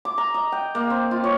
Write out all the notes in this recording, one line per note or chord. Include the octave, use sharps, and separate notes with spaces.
D6
A#5
D#5
G5
A#3
C4
F4
C#5